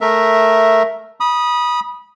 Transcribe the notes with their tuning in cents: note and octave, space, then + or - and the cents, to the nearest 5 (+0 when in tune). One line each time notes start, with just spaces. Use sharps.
A3 +0 A#4 +0 E5 +0
B5 -25 D#6 +0